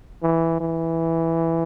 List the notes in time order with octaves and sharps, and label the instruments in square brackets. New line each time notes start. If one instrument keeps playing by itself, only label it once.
[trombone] E3
E3